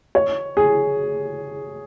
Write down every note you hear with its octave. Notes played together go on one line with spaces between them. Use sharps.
C#5
G#4